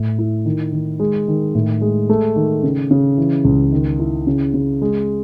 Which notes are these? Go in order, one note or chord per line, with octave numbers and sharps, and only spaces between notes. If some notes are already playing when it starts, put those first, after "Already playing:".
Already playing: A2
E4
D#3
D#3
G#3
D#3
A2
G#3
A3
D#3
C#3
C#3
E3
C#2
D#3
E4
C#3
C#3
G#3